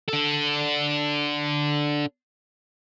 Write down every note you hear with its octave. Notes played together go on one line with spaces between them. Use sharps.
D4 A4